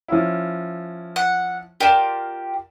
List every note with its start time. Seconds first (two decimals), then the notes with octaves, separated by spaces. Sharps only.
0.08 F3 C#4 E4
1.16 F#5
1.80 F4 G4 A#4 D5 E7